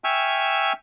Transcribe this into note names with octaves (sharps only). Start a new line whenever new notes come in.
E5 G5 G#5 C#6 E6 F6